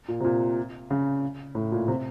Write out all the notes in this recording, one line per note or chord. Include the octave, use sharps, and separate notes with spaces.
A#2
C3
A#2
C#3
A2
A#2
C3